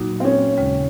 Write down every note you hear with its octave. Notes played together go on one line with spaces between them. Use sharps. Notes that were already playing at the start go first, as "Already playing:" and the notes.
Already playing: A#2 F#3 A#3 D#4 F#4
C4
C#4
D#2 C#3 G#3